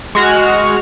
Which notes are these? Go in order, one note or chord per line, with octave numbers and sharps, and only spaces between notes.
G#3 F#4 F6